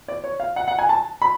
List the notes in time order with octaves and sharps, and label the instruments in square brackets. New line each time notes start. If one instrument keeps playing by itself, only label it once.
[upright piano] D5
C#5
F5
F#5
F#5
G#5
A5
B5